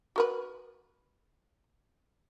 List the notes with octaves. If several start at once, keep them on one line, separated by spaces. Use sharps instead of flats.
F#4 A#4 B4